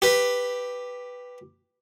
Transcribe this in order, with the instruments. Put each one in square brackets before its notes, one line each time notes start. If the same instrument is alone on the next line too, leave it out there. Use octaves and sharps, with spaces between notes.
[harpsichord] G4 B4